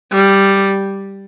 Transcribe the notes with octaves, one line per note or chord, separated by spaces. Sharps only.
G3